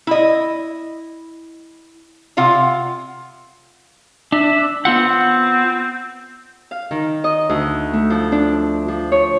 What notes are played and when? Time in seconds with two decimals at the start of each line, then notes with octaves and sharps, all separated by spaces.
0.07 E4 D#5
2.37 C3 F4 F5 F#5
4.32 D4 E5
4.85 B3 C4 F4 F#5
6.71 F5
6.91 D#3
7.24 D#5
7.49 D2
7.93 A3
8.10 F3
8.32 D4
8.88 F3
9.12 C#5